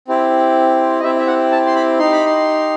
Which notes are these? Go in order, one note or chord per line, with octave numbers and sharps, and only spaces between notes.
C4 E4 G4
D#5
C4 E4 G4 E5
E5
F#5
A5
C6
B5
D#4 G4 C6
B5
C6